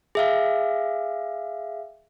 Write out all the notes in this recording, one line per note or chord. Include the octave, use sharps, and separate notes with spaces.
G#4 E5 F5